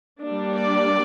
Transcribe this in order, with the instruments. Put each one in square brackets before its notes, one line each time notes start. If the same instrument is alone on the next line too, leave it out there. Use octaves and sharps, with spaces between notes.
[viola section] G3 A#3 D4
D5